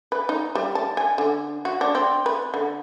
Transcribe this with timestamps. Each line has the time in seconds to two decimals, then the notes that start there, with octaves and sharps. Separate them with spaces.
0.12 B4
0.29 D#4
0.55 G3
0.75 A5
0.97 G#5
1.18 D3
1.65 F#4
1.81 D4
1.95 C4
2.26 B4
2.54 D3